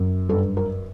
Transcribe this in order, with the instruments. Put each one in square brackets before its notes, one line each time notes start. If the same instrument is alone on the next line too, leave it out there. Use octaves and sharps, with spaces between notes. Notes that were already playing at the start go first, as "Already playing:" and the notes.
Already playing: [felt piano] F#2
G2 A4
A#4